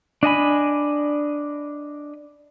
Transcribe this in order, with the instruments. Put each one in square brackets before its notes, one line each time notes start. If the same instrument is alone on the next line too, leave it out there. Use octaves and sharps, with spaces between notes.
[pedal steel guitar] D4 D#5 G#5 B5